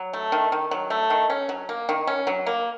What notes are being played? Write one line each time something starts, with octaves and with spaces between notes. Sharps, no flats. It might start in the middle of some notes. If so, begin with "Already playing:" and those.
Already playing: F#3
A3
D#3
D#3
F#3
A3
D#3
C#4
F#3
A#3
D#3
C#4
F#3
A#3